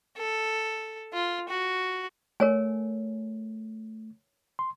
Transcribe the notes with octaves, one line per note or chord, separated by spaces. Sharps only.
A4
F4
F#4
A3 A#4 C#5 G#5
C6